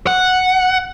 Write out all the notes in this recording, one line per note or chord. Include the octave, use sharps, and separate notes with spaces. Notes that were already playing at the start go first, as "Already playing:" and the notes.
F#5